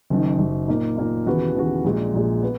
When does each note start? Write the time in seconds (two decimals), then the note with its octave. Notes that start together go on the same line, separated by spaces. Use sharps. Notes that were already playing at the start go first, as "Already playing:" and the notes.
0.10 F#1 F#2 D#3
0.39 F#1 F#2 D#3
0.68 A#2 A#3 D#4
0.97 A#2 A#3 D#4
1.26 D#2 C#3 E3 B3 F#4
1.55 D#2 C#3 E3 B3 F#4
1.84 A#1 A#2 G#3
2.13 A#1 A#2 G#3
2.42 B3